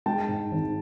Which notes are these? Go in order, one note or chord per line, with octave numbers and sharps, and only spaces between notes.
G#3 G5 A5
G#2
G#1